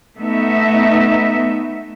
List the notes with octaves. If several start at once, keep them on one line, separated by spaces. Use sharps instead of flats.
A3 B3 D#4 E5